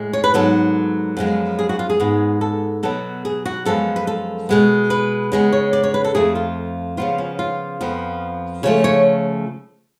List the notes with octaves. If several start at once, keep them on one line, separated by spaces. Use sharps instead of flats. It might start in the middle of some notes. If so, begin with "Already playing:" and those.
Already playing: A2 G#3
C#5
B4
G#2 F#3 B3 A4
F#2 F3 G#3 B3
G#4
F#4
F4
G#4
G#2 G#3 B3
A4
B2 F#3 B3 A4
G#4
F#4
F#2 F3 G#3 B3 A4
B4
A4
B2 G#3 B3
B4
C#3 G#3 B3
C#5
D5
C#5
B4
A4
F2 F3 A3 G#4
F4
C#3 F3 B3 F4
C#4
F4
F2 F3 B3
C#3 F3 A3 C#5
C#5